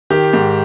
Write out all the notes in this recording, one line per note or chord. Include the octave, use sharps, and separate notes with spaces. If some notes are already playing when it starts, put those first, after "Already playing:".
D#3 G4
G#2